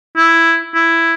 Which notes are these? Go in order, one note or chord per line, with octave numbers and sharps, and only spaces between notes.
E4
E4